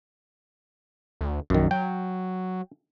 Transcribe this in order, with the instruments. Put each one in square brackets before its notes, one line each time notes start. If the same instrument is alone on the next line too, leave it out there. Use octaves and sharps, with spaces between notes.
[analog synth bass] D2
[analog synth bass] A#1 [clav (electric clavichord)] F#2 D#3
[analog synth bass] F#3 [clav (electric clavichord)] G5